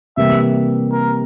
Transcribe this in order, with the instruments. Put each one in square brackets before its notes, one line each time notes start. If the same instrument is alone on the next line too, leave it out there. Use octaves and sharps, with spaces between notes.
[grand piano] C3 E3 G3 A#3 [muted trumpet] E5
[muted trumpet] A#4